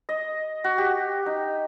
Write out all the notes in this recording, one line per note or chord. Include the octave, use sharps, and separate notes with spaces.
D#5
F#4
G4
D#4